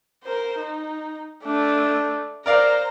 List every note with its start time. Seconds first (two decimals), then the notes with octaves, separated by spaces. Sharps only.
0.24 A#4 C5
0.59 D#4
1.44 A3 D4
2.46 A#4 C5 D5 F5 A#5